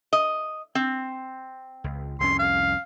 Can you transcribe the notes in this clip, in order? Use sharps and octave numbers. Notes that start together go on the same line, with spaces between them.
D#5
C4
C#2
C2 F2 C#4 C6
F5